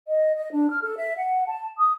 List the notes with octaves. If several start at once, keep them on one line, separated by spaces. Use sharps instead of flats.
D#5
D#5
D4
F6
A4
E5
F#5
A5
D#6